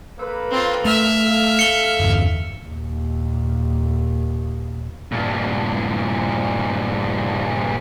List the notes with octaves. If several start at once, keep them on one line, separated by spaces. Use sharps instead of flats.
A#3 A4 B4
C4 F4
A3 E5 F6
A4 F5
C#7 G7
G1 E2
D#2 A#2
G2 A#2